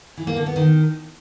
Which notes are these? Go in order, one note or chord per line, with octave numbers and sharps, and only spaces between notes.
E3
A#3
D3
B3
D#3